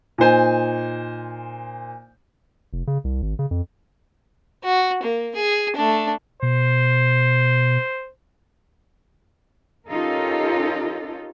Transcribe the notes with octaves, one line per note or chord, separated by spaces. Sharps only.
A#2 D#4 C5 G#5
F1
C#3
C2
G#1
C#3
F2
F#4
A#3
G#4
A3 D4
B2 C5
C#4 D#4 F4 G4 A4 A#4